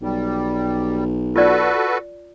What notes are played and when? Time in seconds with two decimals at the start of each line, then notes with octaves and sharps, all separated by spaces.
0.02 B1 G3
1.36 F4 F#4 A4 B4 D5